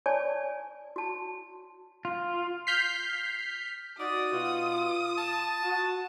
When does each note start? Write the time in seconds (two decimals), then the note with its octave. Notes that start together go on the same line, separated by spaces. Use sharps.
0.06 C#5 D5 G#5 A5
0.96 F#4 A5
2.05 F4
2.67 F6 G6 B6 C7
4.00 D#4 F#4 D5 D#6
4.33 B2 F4
5.18 A5
5.63 F#4